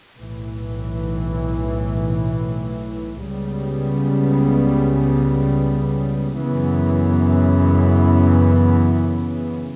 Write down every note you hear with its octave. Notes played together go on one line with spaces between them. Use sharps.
B1 A2 E3
C#2 C#3 G3 B3
F#2 C#3 E3 B3